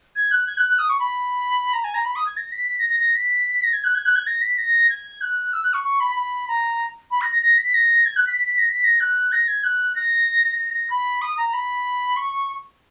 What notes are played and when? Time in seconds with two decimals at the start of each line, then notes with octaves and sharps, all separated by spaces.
0.16 G#6
0.31 F#6
0.47 G#6
0.58 F#6
0.69 F#6
0.79 D#6
0.89 C#6
1.00 B5
1.73 A#5
1.84 G#5
1.94 A#5
2.05 B5
2.16 D#6
2.27 G#6
2.37 A#6
2.52 B6
2.68 B6
2.79 A#6
2.89 A#6
3.00 A#6
3.15 B6
3.63 A#6
3.73 G#6
3.84 F#6
3.95 G#6
4.06 F#6
4.16 G#6
4.27 A#6
4.42 B6
4.58 A#6
4.90 G#6
5.21 F#6
5.53 E6
5.63 F#6
5.73 C#6
5.84 C#6
6.00 B5
6.16 B5
6.48 A#5
7.11 B5
7.21 A#6
7.32 A#6
7.42 A#6
7.58 B6
7.74 A#6
8.06 G#6
8.16 F#6
8.27 B6
8.37 B6
8.48 B6
8.58 A#6
8.69 B6
8.84 A#6
9.00 F#6
9.32 A#6
9.48 G#6
9.64 F#6
9.96 A#6
10.59 A#6
10.74 A#6
10.90 B5
11.22 D#6
11.37 A#5
11.53 B5
12.16 C#6